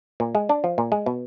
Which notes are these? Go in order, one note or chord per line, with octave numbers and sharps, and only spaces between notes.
A#2
G#3
D4
F3
A#2
G#3
B2